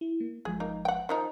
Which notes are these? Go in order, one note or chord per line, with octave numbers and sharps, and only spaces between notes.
E4
A#3
G1 F3 G#3 G#4
A#3 D#4
F#5 G5
D#3 F3 D#4